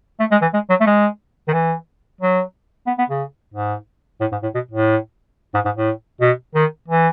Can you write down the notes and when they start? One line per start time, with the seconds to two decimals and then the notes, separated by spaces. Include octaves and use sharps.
0.20 A3
0.31 G#3
0.42 E3
0.53 G#3
0.70 F#3
0.80 A3
0.86 G#3
1.48 D#3
1.53 E3
2.21 F#3
2.87 B3
2.98 B3
3.09 C#3
3.54 G#2
4.21 A2
4.32 G#2
4.43 A2
4.54 B2
4.71 A2
5.54 G#2
5.65 G#2
5.77 A2
6.21 B2
6.55 D#3
6.88 E3